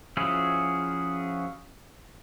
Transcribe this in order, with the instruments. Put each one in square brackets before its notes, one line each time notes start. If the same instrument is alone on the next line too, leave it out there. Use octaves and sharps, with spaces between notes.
[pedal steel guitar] F3 C#4 E4 F#4 G#4